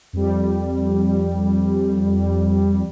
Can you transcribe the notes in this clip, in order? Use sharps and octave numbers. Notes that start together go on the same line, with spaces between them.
F2 G3